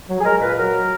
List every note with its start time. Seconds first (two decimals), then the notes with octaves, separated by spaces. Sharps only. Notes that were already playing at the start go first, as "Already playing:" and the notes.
0.09 F#3
0.20 G#4
0.24 G#3 A#4
0.41 A#2 B4
0.57 F#3 A#4